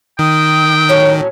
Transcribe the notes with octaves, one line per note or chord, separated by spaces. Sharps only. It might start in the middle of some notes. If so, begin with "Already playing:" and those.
D#3 G5 D#6
A2 F#3 C#4